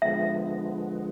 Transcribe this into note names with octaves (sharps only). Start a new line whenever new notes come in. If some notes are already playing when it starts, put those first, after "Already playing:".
D3 F3 G#3 B3 E5